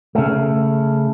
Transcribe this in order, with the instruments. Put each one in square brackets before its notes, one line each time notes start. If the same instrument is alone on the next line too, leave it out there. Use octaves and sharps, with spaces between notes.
[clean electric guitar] C#3 A3